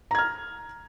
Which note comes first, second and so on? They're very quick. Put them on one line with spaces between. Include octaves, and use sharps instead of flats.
A#5 G#6 F6